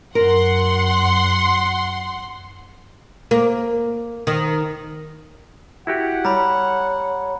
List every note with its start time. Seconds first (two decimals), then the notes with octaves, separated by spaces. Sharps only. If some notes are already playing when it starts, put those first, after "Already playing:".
0.15 F#2 A#4 F#5 C6
3.31 A#3
4.27 D#3
5.87 E4 F#4 G4 F#5
6.25 G3 C#5 A#5 B5